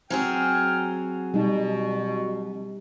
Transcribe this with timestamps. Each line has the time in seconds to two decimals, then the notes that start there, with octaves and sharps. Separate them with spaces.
0.10 F#3 C4 G#4 G5 G#5 F6
1.34 B2 G3 D#4